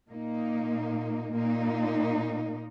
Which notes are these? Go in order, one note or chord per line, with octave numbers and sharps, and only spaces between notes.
A#2 A#3 D#4
A#2 A#3 D#4